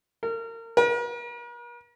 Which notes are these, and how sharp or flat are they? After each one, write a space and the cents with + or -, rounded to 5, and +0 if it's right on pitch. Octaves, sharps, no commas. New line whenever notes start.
A#4 -30
A#4 +45